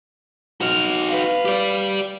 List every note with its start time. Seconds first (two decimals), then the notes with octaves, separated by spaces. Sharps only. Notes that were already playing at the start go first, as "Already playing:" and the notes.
0.61 D#4 F#4 F6
1.07 B4 F5
1.45 G4 D5